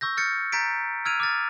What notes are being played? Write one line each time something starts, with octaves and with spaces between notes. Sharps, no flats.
C#6 E6 G6 A#6
F6 G6 A6 C#7
A#5 G6 A6 B6 D7
E6 F6 G#6 D7 D#7 F7
D6 F6 A6